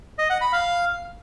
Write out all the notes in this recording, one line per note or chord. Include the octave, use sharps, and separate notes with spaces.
D#5
F#5
B5
F5